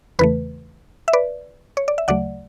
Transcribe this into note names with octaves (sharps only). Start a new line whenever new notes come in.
E2 C#3 E3 A3 B4
E5
B4 D5
C#5
D5
E5
D2 C#3 F#3 A3 D5 F#5